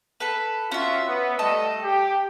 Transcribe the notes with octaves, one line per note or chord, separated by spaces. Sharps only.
A4 B4
C#4 F4 F#4 E5
B3
G3 A3 A4 D#5
G4